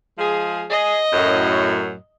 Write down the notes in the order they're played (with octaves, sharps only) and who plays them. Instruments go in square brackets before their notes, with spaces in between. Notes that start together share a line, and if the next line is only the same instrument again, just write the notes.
[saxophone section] F3 G#3 G#4
[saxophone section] G#4 [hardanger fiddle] D#5
[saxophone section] F#2 A2